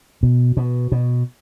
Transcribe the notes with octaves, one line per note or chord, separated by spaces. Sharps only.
B2
B2
B2